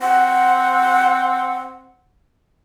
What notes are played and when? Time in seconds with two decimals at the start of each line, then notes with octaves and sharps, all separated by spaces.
0.02 C4 F#5